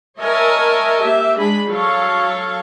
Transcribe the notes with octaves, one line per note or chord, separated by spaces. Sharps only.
A#4 C#5 D#5 E5 G#5 A5
A#3 G4 E5
G#3 D4 G#4 B5
F#3 A4 C#5 F5